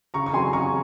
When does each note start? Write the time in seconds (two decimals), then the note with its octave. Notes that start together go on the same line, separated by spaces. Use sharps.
0.14 C#3 A#5 C#6
0.26 C#6
0.33 F#3 C4 G#5 C6
0.53 C#3 A#5 C#6